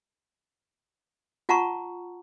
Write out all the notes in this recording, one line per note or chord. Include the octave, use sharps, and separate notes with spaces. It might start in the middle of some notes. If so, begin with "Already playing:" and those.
F4 F#5 A5 A#5 C#6